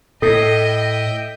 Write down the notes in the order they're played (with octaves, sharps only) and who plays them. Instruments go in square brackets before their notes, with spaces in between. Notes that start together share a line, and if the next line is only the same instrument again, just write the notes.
[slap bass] A2 [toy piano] A4 [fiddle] D#5 [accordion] E5 G5 G6